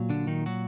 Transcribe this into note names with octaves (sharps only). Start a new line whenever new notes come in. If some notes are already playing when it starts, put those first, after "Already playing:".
Already playing: A#2 F#3
D3 D4
D#3 D#4
F#3 F#4